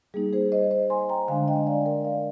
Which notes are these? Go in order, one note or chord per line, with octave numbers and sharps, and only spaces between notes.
G3 A#3 D#4 G#4
G#4 C5
C5 D#5
C5 D#5
G#5 C6
G5 A#5
D3 G#3 D4 F5 G#5
D#5 G5
D5 F5
A#4 D5
D5 F5